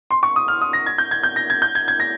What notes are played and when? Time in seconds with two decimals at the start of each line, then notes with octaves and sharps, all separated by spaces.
0.11 C6
0.23 C#6
0.36 D#6
0.48 F6
0.61 D#6
0.73 A#6
0.86 G#6
0.98 G6
1.11 G#6
1.23 G6
1.36 A#6
1.50 G#6
1.62 G6
1.75 G#6
1.88 G#6
2.00 A#6